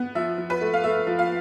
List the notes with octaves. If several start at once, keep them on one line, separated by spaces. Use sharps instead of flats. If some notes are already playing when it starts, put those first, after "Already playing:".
Already playing: B3
F3 E5
F3
B4
A3
F5
A3 E5
F3
F5